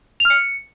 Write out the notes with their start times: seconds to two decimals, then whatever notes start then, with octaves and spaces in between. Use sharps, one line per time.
0.20 F7
0.25 F6
0.30 C#7